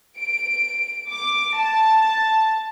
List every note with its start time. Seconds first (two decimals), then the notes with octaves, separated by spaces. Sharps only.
0.18 D7
1.10 D6
1.56 A5